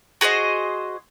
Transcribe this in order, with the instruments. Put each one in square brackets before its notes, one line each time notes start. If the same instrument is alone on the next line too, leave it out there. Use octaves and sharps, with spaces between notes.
[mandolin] F#4 G#4 C5 D#5